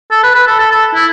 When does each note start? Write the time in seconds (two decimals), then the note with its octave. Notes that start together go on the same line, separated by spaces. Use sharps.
0.11 A4
0.23 B4
0.35 B4
0.47 A4
0.59 A4
0.71 A4
0.94 E4